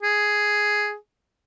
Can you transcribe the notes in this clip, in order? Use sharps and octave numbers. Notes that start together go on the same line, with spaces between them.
G#4